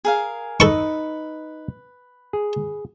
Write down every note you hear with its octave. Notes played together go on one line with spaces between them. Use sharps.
G#4 A#4 F5
D#4 A4 B4 D#5 C#6
G#4